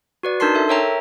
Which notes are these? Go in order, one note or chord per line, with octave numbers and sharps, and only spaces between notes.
F#4 B4 D5
D4 D#4 A#4 A5 C6 C7
A4 E5
A#4 C#5 E5 G5 A#5